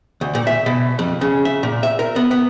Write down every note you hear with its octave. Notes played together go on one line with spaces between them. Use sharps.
D2
A#2
E5
B2
F2
C#3
E5
A#2
E5
A#4
B3
B3